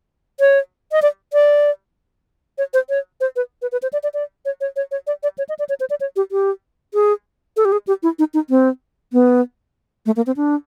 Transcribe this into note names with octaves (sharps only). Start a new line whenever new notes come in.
C#5
D#5
D5
D5
C#5
C5
C#5
C5
B4
B4
B4
C5
D5
D5
D5
C#5
C#5
C#5
C#5
D5
D5
C#5
D#5
D5
C#5
C5
D5
C#5
G4
G4
G#4
A4
G4
G#4
G4
E4
D#4
D#4
C4
B3
A3
A#3
C4
D4